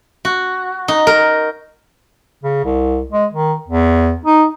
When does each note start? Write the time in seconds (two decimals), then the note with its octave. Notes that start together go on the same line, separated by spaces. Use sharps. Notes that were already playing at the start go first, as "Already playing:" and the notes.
0.25 F#4
0.88 D#4
1.07 A#4
2.44 C#3
2.65 C2
3.12 G#3
3.33 D#3
3.68 E2
4.26 D#4